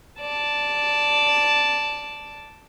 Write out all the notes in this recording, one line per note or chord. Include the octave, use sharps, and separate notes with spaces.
D5 A5